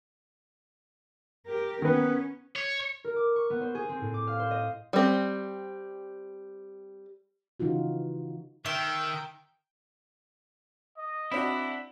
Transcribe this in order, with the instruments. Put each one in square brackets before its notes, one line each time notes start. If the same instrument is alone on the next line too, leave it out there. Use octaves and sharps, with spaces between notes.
[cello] G4 A#4
[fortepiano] D#3 B4 [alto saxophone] B3 [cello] C#4
[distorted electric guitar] C#5
[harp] A#4
D6
C#6
B3
C5
G#4
C4
A2
D6
F5
C5
D#5
[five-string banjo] G3 C4
[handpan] C#3 E3 D#4 F4 F#4
[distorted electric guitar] D#3 [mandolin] E5 [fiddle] G5
[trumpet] D#5
[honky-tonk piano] C4 D4 F#4 [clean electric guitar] E4